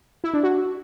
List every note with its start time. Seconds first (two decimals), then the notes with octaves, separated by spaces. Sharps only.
0.24 E4
0.34 D4
0.43 F#4